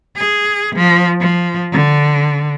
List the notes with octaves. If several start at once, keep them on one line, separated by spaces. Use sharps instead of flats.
G#4
F3
F3
D3